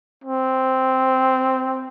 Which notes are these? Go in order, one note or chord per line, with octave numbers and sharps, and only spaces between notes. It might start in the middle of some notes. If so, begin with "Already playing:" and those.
C4